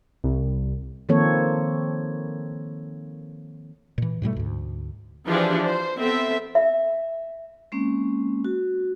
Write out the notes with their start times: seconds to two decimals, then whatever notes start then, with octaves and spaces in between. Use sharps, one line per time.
0.24 C2
1.09 D#3 F3 A#3 C4 A4 C#5
3.98 A#2 E3
4.22 G#2 B2 G3 A3
4.36 D2 G#2
5.26 E3 F3 D4 G4 G#4
5.65 C5
5.97 B3 C4 A4 E5
6.55 E5
7.72 G#3 A#3 C4 C#4
8.45 F#4